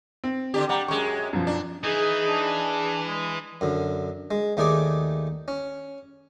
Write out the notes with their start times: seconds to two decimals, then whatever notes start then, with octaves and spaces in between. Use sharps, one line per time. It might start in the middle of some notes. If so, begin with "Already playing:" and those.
0.24 C4
0.54 D3 D4 G4
0.69 G3 F#5 A#5
0.88 F#2 G#3 C#6
1.33 F#2 B2 F3
1.47 D4
1.84 E3 D#4 G#4
2.28 D4
3.07 G#3
3.61 F#2 D3
4.31 G#3
4.57 D#2 A3 D#4 G#4 D5 D6
5.48 C#4